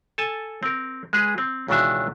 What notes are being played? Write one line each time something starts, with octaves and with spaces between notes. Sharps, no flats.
A4 G#5 A5
C4 A#4
G#3 G#4 B4
C4
C#2 B2 D#3 E3 D4 E5